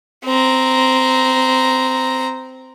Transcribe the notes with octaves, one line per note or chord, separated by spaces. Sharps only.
C4 A#5